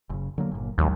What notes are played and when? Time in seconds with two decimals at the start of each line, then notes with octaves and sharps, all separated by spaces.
0.10 F#1 C#3
0.38 D3 F#3 A#3
0.52 G1 A#2
0.78 A1 D#2 F#3 G#3